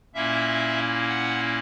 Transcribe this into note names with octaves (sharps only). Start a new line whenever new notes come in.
A#2 A#3 C#4 E4 E5
F#5